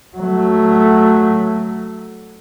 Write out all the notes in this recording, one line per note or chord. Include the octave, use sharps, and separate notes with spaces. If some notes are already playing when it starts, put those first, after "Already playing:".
F#3 A3